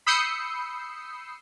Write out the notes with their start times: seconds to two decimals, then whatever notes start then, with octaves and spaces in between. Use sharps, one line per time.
0.06 B5 D#6 E6 G6 C7 C#7